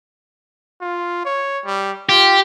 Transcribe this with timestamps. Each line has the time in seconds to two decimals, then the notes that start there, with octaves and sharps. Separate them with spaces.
0.81 F4
1.25 C#5
1.65 G3
2.09 F4 G4